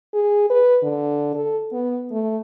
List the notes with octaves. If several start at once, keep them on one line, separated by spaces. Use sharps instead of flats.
G#4
B4
D3
A4
B3
A3